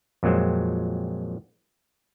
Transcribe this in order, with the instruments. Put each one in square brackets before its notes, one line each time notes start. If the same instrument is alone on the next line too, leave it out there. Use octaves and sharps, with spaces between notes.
[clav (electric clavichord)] F2 A#2 F#3 G#3 C4